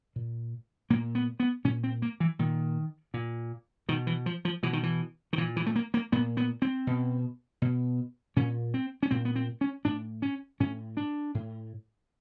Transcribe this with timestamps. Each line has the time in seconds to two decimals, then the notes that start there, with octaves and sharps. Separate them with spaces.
0.16 A#2
0.90 A#2 A#3
1.15 B3
1.40 B3
1.64 A#2 C#4
1.83 C4
2.02 A#3
2.20 E3
2.39 A#2 D#3
3.14 A#2
3.89 B2 D#3
4.07 E3
4.26 F3
4.45 F3
4.63 B2 E3
4.73 D#3
4.83 E3
5.33 D#3
5.38 A#2 E3
5.56 E3
5.66 A3
5.76 A#3
5.94 A#3
6.12 A#2 B3
6.37 B3
6.62 C4
6.87 B2
7.62 B2
8.36 A#2 C#4
8.74 C4
9.03 C#4
9.11 A#2 C4
9.25 B3
9.36 C4
9.61 C#4
9.85 A2 D4
10.22 C#4
10.60 A2 C#4
10.97 D4
11.34 A2